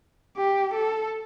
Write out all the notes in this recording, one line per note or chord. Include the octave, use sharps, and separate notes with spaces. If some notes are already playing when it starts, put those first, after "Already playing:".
G4
A4